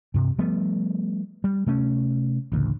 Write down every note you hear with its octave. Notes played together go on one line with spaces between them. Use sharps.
G2 C3
F3 G3 A3 B3
G3
C3 A3 C#4
A1 D2 C#3